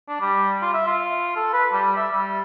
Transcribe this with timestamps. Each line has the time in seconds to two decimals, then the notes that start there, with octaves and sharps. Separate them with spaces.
0.08 D4
0.21 G3
0.62 F4
0.74 E5
0.87 F4
1.36 A4
1.53 B4
1.73 G3
1.97 E5
2.12 G3